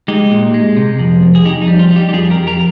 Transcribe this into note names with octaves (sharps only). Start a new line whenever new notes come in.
G#3 D#4 G4
A#2
G#3
C3
F2
F2
G#4
F2 D#4 G4
D#4
G3
F4
G3
D#4 G4
G4
F2 F4 G#4
G4 A#4
F2
G4 A#4